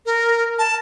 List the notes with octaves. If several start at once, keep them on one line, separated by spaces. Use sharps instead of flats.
A#4
A5